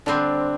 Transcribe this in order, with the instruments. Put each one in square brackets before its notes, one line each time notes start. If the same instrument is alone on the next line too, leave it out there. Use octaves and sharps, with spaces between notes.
[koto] D3 G3 C4 [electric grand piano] D4